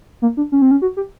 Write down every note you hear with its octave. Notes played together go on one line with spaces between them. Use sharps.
A#3
D4
C#4
C4
C#4
F#4
G4